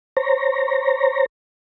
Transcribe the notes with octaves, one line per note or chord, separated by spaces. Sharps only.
C5 C#5 A#5